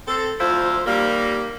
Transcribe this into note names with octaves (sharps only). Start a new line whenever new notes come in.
C4 A4
D2 F3 E4 F4 C5
D#2 G3 A#3